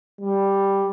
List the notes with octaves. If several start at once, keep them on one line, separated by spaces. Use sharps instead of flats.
G3